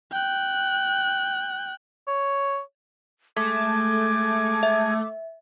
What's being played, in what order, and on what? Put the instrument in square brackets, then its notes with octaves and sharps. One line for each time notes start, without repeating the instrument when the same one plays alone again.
[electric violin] G5 F#6
[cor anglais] C#5
[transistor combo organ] G#3 G#4 [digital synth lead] A3 [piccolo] D6
[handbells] E5